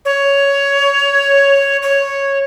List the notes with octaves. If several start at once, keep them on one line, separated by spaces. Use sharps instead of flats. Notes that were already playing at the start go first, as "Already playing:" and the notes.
C#5
C#5